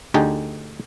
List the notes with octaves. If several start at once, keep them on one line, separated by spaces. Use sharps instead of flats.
D2 D3 D#4 G4 G#4 D5